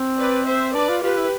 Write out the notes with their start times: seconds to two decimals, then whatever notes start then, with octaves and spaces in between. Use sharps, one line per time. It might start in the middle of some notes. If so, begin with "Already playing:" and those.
Already playing: C4
0.19 B4 D5
0.47 C5 E5
0.75 D4 B4 D5
0.89 F4
1.03 F4 G4 B4
1.17 E4